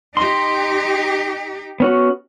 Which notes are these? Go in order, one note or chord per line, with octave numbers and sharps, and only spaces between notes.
D#4 G4 C6
B3 C#4 F#4